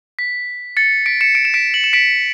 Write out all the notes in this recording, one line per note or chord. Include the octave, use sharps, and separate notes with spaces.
B6
A6 C#7
B6 D7
C#7 E7
D7
E7
B6 D7
F#7
E7
B6 D7